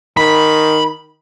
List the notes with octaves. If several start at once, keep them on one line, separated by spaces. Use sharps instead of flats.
D#3 B5